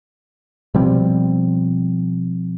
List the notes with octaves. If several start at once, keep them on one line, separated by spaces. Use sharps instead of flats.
B2 F3 G3 C4